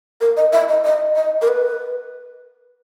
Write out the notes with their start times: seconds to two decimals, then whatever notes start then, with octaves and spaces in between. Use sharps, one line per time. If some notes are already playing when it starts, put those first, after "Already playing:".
0.21 A#4
0.37 D#5
0.53 E5
0.68 D#5
0.85 D#5
1.16 D#5
1.42 A#4
1.48 B4